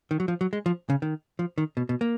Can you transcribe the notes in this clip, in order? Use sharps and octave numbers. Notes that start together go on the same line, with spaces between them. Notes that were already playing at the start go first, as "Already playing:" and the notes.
D#3
F#3
F3
F#3
G#3
F3
C#3
D#3
F3
D#3
B2
B2
A#3